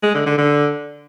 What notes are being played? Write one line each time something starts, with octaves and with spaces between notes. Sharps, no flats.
G#3
D3
D3
D3